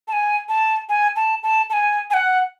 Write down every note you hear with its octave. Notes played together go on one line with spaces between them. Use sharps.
A5
G#5
A5
G#5
A5
A5
A5
G#5
G#5
F#5